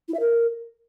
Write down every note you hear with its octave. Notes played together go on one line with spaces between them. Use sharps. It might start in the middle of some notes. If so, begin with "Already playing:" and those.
E4
E5
A#4